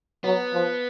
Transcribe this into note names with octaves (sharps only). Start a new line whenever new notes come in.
F#3 B3
F3